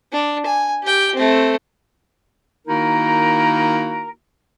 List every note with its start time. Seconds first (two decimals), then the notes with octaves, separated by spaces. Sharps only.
0.12 D4
0.46 G#5
0.83 G4 G5
1.15 A3 C4
2.68 D#3 A#3 D#4 E4 F#4 A#4